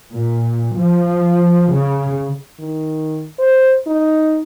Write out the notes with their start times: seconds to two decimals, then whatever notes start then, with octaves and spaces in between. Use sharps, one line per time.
0.12 A#2
0.75 F3
1.74 C#3
2.60 D#3
3.39 C5
3.87 D#4